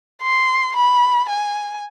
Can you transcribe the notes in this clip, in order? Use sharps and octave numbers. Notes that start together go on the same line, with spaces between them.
C6
B5
G#5